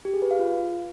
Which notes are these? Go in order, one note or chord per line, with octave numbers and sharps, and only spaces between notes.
G4
G#4
B4
F5
F4